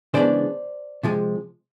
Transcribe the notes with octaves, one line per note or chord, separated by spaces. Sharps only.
C#3 E3 G#3 B3 D4 C5 D5
C3 F3 G#3